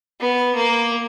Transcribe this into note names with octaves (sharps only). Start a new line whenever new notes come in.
B3
A#3